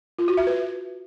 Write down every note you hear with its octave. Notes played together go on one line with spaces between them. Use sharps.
F4
F#4
E5
B4